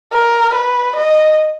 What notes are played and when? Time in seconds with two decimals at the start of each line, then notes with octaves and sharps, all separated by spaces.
0.13 A#4
0.55 B4
0.96 D#5